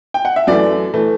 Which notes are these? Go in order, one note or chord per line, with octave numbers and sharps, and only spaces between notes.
G5
F#5
E5
F#2 E3 A3 D5
E3 A3